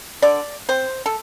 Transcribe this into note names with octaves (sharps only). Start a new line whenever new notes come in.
D3 D5
C4 C5
A4